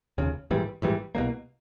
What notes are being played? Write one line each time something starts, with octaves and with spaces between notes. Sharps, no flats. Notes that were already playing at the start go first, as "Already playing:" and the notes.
F1 D#2 C#3
A#1 G#2 E3 G3
A#1 G#2 E3 G3
C2 B2 G3 A#3